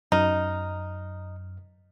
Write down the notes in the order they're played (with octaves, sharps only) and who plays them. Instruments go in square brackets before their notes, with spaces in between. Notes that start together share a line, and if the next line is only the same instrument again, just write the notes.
[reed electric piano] F#2 F6 [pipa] D#4